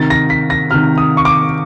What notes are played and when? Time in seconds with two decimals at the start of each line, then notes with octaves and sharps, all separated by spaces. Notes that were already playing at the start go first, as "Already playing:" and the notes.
Already playing: C3 D#3 A6
0.10 A#6
0.30 B6
0.50 A#6
0.71 C3 D#3 F6
0.98 D#6
1.17 C#6
1.25 D6